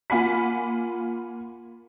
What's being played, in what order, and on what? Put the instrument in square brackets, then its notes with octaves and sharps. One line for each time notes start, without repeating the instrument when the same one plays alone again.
[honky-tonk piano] A#3 F4 F#5 G#5 B5 B6